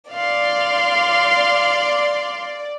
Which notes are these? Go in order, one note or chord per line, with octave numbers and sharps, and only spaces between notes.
D5 F5 C6